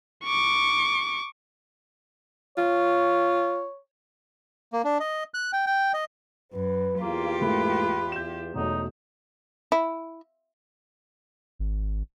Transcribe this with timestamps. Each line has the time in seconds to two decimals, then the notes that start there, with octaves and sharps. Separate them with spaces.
0.24 C#6 D6
2.58 F4 C#5
4.73 A#3
4.85 D4
5.00 D#5
5.34 F#6
5.53 G5
5.67 G5
5.94 D#5
6.53 F#2 B4
7.01 E2 A#3 F4 G4
7.41 G#2 A3 A#3 B4
8.12 G6 E7
8.54 E1 E2 F#3 A3 D#4
9.72 E4
11.59 G#1